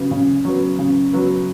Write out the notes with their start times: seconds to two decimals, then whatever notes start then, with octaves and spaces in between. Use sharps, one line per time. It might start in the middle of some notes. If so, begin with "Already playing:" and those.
Already playing: C#3 F#3 B3
0.11 C#3
0.45 F#3 B3
0.79 C#3
1.13 F#3 B3